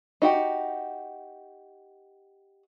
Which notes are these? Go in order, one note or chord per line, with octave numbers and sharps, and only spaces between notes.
D#4 F#4 G4